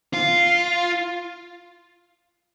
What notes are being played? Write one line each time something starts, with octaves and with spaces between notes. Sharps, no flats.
F4